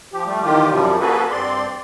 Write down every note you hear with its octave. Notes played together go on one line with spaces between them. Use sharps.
F3 G4
G3 A3
E2 D#3 F4 G4
F#2 C3 F3 G3
A#3 F#4 G#4 A4 B4
G2 C4 D5 C6